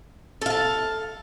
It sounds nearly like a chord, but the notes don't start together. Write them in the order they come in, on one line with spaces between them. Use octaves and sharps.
A4 F5 A5